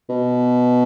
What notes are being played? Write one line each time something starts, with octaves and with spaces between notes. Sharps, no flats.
B2